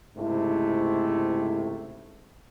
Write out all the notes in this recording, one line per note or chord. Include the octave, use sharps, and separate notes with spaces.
C#2 G#2 C3 A3 E4